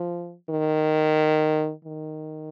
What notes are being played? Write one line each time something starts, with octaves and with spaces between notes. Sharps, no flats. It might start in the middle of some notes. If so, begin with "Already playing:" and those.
Already playing: F3
D#3
D#3